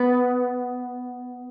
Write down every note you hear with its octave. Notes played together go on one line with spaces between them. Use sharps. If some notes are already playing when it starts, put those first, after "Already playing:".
Already playing: B3